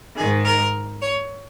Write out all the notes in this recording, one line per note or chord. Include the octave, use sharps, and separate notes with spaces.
G#2 D#3 G#4
A#4
C#5